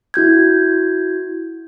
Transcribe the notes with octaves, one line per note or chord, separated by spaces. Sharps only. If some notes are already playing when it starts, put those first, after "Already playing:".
E4 F#4 G6 G#6